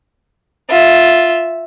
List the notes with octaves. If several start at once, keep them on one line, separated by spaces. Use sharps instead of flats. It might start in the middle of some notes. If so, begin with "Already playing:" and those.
F4 E5